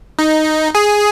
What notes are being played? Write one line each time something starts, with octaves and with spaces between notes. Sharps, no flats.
D#4
G#4